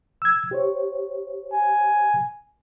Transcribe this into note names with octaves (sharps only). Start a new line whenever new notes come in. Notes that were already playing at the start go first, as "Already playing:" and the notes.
E6 G#6
G4 C5 C#5
G#5